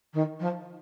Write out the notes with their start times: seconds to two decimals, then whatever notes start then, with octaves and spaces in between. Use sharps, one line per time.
0.14 D#3
0.40 F3